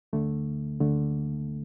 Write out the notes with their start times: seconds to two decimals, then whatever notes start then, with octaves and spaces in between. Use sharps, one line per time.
0.13 D2 D3 A3
0.80 D2 D3 A3